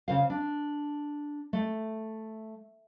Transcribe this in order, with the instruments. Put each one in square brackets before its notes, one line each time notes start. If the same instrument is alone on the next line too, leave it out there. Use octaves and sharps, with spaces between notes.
[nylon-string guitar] C#3 C5 F5
D4
A3